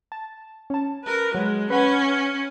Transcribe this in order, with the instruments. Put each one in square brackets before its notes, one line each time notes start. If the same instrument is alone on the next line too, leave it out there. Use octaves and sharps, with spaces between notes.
[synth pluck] A5
C#4 A5
[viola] A#4 B4
[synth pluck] F#3 [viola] G#3
[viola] C#4 [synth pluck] B4 F#5 B5